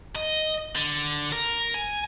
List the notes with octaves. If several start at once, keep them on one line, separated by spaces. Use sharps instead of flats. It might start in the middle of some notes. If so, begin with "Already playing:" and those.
D#5
D3
A#4
G#5